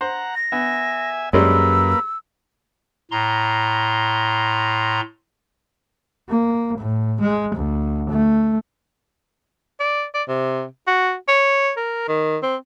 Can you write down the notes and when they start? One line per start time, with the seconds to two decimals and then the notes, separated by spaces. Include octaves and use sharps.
0.01 C5 F#5 A#5
0.35 A#6
0.52 B3 E5 G#5
1.33 F#2 G3 G#3 A#3 C#4 B4 E6
3.11 A2 A#5 C6
6.29 A#3
6.78 A2
7.20 G#3
7.55 D2
8.09 A3
9.80 D5
10.14 D5
10.28 C3
10.87 F#4
11.28 C#5
11.77 A#4
12.08 D#3
12.43 C4